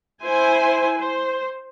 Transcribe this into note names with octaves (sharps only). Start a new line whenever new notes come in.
E4 C5 G#5
C5